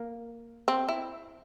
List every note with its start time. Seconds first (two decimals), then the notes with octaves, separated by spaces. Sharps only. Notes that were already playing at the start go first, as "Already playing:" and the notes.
Already playing: A#3
0.68 C4
0.88 E4